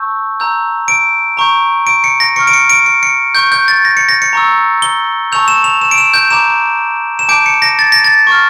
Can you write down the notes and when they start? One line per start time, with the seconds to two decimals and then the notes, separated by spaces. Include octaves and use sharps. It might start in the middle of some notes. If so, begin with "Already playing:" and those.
Already playing: A5 C#6 E6 G6
0.40 A#5 E6 G6
0.88 D7
1.37 A#5 C#6 G6
1.87 D7
2.04 C#7
2.20 A#6
2.36 C#6 F6 C#7
2.47 D7
2.53 C#7
2.69 D7
2.86 C#7
3.03 C#7
3.35 C#6 G6
3.52 G6
3.68 A6
3.85 A#6
3.97 C#7
4.09 A#6
4.22 C#7
4.33 A#5 C#6 E6
4.82 G7
5.32 A5 C#6 E6 G6 F7
5.48 E7
5.64 F7
5.81 E7
5.91 D7
5.98 E7
6.14 G6
6.31 A#5 D6 G6 E7
7.19 E7
7.29 A5 D6 G6 D7
7.46 C#7
7.62 A#6
7.79 A6
7.92 A#6
8.04 A6
8.27 C#6 F6